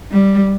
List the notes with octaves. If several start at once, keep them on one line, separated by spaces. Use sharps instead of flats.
G3